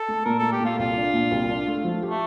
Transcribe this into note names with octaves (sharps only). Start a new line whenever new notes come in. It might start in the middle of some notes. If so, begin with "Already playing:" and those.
Already playing: A4
A3
A#2 A#4
A3 A4
G4
A#2
F4
C2 F4
D4
A#2
C2
D4
A3
F3
G4
A3